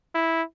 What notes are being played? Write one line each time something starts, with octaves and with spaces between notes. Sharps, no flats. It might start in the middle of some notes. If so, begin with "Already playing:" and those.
E4